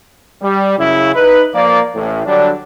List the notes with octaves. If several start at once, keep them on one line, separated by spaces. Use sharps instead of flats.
G3
F#2 C#3 E4
D#4 B4
F3 A#3 D5
A1 A2
D3 F#3 G3 D4